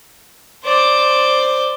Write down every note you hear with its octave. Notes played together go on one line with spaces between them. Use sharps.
C5 D5